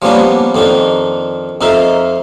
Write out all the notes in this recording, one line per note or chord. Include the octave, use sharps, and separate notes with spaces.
F3 G3 A#3 B3 C#4 D4
F2 D#3 D4 D#4
F2 D#4 A#4 E5 F5